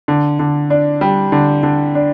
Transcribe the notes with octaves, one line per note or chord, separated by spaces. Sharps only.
D3
D3
D4
G3
D3
D3
D4